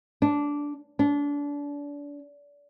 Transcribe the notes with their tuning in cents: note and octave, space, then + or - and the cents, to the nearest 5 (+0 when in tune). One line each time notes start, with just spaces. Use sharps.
D4 -10
D4 -30